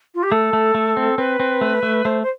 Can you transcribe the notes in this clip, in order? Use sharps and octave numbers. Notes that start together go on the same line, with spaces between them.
F4
G4
A3 A4
A3
A3
C4
C4 B4
C4
A3
A3
A3 C5
C5